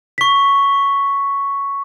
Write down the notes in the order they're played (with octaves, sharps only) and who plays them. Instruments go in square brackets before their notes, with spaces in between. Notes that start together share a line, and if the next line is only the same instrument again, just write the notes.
[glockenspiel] C#6 B6